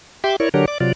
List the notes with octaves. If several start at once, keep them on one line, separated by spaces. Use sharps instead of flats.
G4 E5 G5 C6 D6
E4 A#4 C#5 D5 C#6
D3 F#3 D4 G4 A#4 C#5
D5 D6
C3 F#3 F4 D5